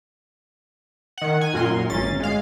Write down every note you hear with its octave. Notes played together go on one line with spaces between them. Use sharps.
D#3 F#5
G#5
F#2 A#2 A#4 C6
G#1 C#4 A6
G#3 F5